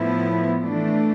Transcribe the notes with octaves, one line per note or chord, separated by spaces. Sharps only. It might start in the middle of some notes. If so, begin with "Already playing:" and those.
Already playing: A2 F3 B3 E4
E3 A3 D4